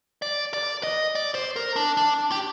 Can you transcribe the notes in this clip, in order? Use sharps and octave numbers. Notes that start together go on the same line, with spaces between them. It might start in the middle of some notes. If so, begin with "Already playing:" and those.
D5
D5
D#5
D5
C5
A#4
D4
D4
G4